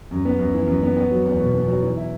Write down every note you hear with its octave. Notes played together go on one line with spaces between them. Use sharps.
F#2
B3
F#2
E3
F#2
B3
B3
F#3
E2
B2
B3
F#3
E3
E4